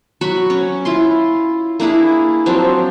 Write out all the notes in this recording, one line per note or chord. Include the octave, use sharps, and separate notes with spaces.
F#3 F#4 B5 C#6
C#4
E4 F4 C6
A#3 D4 E4 G#4
F3 F#3 C4 D4